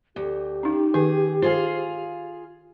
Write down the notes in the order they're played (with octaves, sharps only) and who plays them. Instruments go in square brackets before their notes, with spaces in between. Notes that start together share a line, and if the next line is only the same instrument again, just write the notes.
[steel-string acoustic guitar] D2 [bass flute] G4
[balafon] C#4 D#4
[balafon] D#3 B4 [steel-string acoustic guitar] G#4
[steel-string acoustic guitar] F4 G#4 F5 [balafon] C5